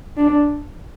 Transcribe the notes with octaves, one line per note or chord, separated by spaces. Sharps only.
D4